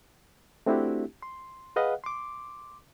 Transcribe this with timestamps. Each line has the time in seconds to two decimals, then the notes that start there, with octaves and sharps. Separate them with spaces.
0.66 A3 C4 D4 E4 F#4 G4
1.22 C6
1.76 G#4 B4 D#5 F5 F#5
2.04 C6 D6